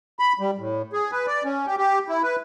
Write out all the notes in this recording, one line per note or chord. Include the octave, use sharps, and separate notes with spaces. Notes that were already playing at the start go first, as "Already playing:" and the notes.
B5
G3
A2
G#4
B4
D5
C#4
G4
G4
E4
B4